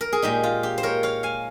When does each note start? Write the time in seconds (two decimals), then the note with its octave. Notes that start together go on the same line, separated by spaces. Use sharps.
0.01 A#4
0.13 G#4
0.22 A#2 G#3 D#4 G4
0.43 F4
0.63 G4
0.78 C5
0.83 A#4 C#5
1.03 C#5 F5
1.23 F5 G#5